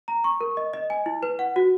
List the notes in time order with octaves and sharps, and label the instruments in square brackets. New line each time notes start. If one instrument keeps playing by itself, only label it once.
[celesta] A#5
C#6
A#4
D#5
D#5
G#5
E4
B4
F#5
F#4